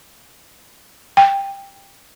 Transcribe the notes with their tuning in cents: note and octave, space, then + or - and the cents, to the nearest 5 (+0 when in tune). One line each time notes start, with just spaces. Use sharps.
G5 +15